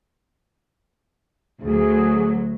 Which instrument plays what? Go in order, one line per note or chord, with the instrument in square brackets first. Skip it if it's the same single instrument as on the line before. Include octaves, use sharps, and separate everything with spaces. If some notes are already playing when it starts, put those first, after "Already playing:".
[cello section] D2 F#3 [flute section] G#4